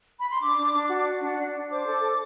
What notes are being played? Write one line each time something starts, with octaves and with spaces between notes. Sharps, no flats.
B5
C6
D4 D6
D4
D4
F#4
F#4
D4
D4
D4
C5 D6
A4
A4